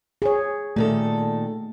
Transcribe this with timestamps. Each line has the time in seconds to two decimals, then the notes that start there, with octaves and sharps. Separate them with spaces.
0.22 G#4 C#5
0.76 A#2 D#3 A3 A4